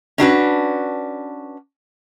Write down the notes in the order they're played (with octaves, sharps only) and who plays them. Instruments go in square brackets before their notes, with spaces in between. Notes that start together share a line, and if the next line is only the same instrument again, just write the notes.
[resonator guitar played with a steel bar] C#4 D4 F#4 B4